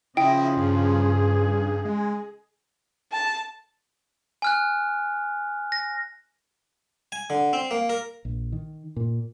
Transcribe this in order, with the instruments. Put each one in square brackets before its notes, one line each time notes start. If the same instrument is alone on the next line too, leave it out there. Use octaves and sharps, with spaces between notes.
[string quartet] C#3 F3 [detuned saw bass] E4 [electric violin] D#5 [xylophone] G5
[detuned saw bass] G2 [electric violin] G#4
[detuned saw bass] G#3
[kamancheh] A5
[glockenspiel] G#5 F6 F#6
A#6
[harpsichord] G#5
D3
C4
A#3
A#4
[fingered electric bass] A#1
D#3
A#2